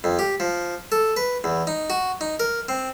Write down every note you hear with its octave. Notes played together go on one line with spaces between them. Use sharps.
F2
G4
F3
A4
B4
E2
D#4
F#4
D#4
A#4
C4